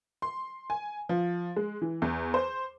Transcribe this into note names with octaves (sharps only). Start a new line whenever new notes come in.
C6
G#5
F3
G#3
E3
E2
C5